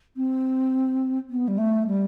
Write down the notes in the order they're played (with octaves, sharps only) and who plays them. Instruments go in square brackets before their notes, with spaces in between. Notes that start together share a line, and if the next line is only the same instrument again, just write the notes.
[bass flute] C4
B3
G3
A3
G3